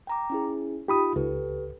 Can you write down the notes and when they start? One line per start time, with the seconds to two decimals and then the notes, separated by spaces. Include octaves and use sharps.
0.07 G5 A#5 D6
0.30 C#4 E4 G#4
0.88 D#4 F4 G4 B5 D#6
1.16 C#2 G4 A4 B4